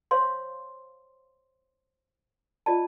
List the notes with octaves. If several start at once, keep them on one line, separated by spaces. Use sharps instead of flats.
C5 C#5 F5 C6
F4 D5 D#5 A5